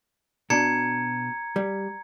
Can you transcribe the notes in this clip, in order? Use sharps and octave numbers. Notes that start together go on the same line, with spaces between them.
B2 D4 A#5 G#6 C#7
G3